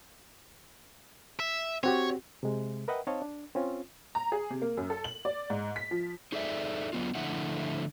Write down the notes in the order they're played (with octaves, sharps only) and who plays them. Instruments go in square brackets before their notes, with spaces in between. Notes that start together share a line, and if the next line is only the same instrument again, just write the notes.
[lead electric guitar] E5
[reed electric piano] C4 F#4 G4 [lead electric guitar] C#5
[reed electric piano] C3 G#3
A#4 B4 D#5 E5 F#5 G5
C4 D#4 C#5 D#5 F5 A5
D4
C4 C#4 F4
[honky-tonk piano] A#5
G#4
C3
A#3
F#2
A4
F#7
D5
G#2
B6
F3
[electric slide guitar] D#4 G#4 A4 D5 E5
F#3 B3 F4
D3 F3 A3 E4 F#5